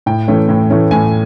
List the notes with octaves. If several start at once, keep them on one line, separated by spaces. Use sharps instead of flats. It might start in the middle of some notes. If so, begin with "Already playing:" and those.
A2 G5
E3 A3 C#4
A2
E3 A3 C#4
A2 G#5